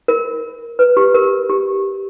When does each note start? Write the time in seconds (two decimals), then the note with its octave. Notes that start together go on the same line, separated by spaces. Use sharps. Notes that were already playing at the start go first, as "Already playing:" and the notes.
0.08 A#4
0.79 B4
0.97 G4
1.14 A#4
1.50 G4